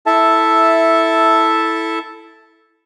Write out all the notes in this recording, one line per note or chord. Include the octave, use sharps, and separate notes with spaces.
E4 A4 E5 A5